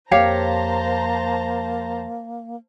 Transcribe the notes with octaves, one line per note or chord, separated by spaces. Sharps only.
F2 A#3 G4 C5 C#5 F5 A5 A#5